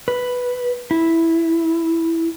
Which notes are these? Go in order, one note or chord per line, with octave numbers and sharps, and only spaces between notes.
B4
E4